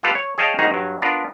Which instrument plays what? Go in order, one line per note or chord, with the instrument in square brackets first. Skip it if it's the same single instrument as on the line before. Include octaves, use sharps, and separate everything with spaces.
[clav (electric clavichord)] F4 G4 A4 B4 F5
C#5
G#4 C#5 D#5 F5 G5 A5
G#2 D#3 D#4 F#4 G#4 A#5
G2 F#3
B3 D4 F4 A#4 B4